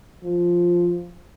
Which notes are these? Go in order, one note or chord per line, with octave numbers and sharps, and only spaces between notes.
F3